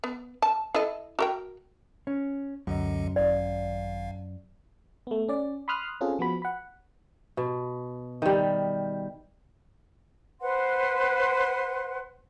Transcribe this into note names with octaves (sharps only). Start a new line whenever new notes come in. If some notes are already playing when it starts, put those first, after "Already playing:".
B3
A5
E4 A4 D#5
F#4 A#4 G5
C#4
C#2 F#2 D3 D#5
G#1 D5 F5
A3 B3
C#4 D5
B5 C6 D#6 F6 F#6
C4 C#4 F4 G#4 A4
F3 B3 F#4 B5
F#5 B5
B2
D#3 G3
B4 C5 F#5 C6